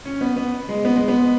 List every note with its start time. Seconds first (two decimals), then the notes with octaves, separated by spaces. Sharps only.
0.05 C#4
0.21 B3
0.36 B3
0.69 G#3
0.85 B3
0.96 G#3
1.08 B3